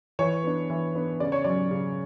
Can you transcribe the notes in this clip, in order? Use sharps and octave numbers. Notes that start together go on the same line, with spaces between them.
E3 C#5
B3 D4
E3
B3 D4
C#3 D5
C#5
F#3 C#4 D5
C#3